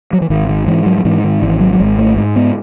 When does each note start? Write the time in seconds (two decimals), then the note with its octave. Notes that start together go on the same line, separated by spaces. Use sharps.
0.13 F#3
0.22 E3
0.30 G#1 D#3
0.49 D#3
0.67 G#2 E3
0.86 F#3
0.98 F#3
1.05 G#2 E3
1.24 D#3
1.42 G#1 E3
1.60 F#3
1.73 F#3
1.80 G#1 G#3
1.98 A3
2.17 G#2
2.36 B3